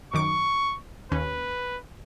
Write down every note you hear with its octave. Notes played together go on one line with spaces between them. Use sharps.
F#2 D#3 C#6 D6
D#2 C#4 B4